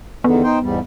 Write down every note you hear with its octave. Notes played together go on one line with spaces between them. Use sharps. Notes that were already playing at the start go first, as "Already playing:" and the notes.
E2 D3 D#3 B3
D#4 C5 G5
E2 G#2 G3